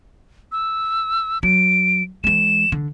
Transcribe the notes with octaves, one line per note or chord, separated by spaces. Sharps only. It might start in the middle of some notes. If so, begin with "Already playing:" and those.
E6
F#3 D7
E3 G#3 E7
D3